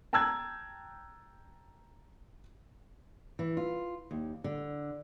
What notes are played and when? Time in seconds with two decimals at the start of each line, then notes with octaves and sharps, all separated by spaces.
0.13 G5 A5 A#5 E6 F#6 G#6
3.39 E3
3.57 F4
4.11 D#2
4.44 D3